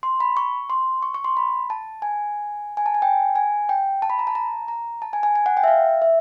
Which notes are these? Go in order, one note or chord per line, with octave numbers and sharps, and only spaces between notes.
C6
B5
C#6
C6
C#6
C#6
C6
B5
A5
G#5
G#5
A5
G#5
G5
G#5
G5
A5
B5
A#5
A5
A#5
A#5
A5
G#5
G#5
G#5
F#5
G5
E5
F5
E5